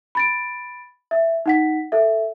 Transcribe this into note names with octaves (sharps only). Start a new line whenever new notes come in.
B5 A6 D7
E5
D#4 F#5 B6
A4 E5